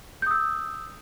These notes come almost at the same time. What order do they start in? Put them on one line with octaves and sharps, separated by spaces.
G6 D#6 E6